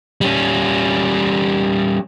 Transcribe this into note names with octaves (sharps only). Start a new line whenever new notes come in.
G3 C#4